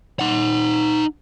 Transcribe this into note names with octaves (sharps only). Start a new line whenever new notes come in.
D#4 F#5